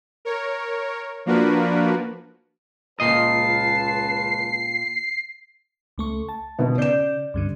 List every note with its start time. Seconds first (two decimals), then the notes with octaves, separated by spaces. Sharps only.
0.25 A#4 C#5
1.26 F3 A#3 D4 F#4 A#4 B4
3.00 C#2 A#2 B4 D#5 A5 C7
5.98 C#2 A3 C#6
6.29 A5
6.59 B2 D#3 B3
6.78 C#3 D5 G6 E7
7.34 C#2 G2 D3